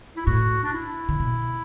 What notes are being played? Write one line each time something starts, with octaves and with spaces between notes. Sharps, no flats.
E4
A2 F#4
D4
E4
D3
B2